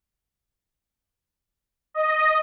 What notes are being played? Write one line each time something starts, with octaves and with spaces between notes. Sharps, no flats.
D#5